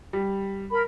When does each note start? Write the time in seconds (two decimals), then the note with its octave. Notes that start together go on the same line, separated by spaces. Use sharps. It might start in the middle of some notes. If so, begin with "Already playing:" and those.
0.13 G3
0.70 A#4 B5